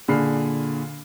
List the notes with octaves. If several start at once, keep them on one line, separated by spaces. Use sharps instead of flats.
A#2 D3 G#4 B5 F6 C7